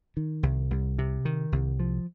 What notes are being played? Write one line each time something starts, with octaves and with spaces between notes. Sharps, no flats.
D#3
C2
C2
C3
D#3
C2
F3